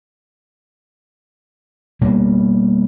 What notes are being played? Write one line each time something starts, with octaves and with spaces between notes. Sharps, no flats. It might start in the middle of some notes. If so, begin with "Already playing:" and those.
B2 G3 A#3